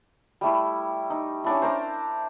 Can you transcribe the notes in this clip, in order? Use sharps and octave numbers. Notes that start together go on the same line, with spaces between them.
G3 A3 E4
D#4
C#4 D4 E4
D4 A#4 C5